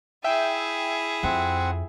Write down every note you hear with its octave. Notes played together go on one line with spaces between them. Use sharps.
E4 G#4 E5 G5
F2 C4 F#5